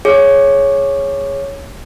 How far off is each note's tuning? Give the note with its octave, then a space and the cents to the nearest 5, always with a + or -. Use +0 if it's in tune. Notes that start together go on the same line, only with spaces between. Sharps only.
G#4 +0 C#5 +0